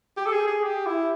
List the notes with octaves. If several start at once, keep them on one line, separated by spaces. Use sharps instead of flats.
G4
A4
G#4
G#4
G4
E4